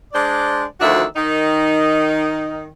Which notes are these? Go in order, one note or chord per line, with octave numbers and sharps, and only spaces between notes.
G#3 D4 C5 D5
D2 D#3 F3 D4 F#4 E5
D#3 D#4